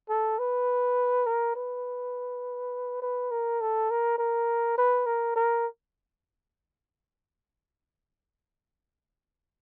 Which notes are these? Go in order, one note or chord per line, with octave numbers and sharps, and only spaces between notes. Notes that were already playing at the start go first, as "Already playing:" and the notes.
A4
B4
A#4
B4
B4
A#4
A4
A#4
A#4
B4
A#4
A#4